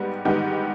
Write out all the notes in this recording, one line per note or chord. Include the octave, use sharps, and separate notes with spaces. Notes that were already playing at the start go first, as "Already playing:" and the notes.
Already playing: G#2 G3 B3 G4
G#2 D#3 G3 B3 G4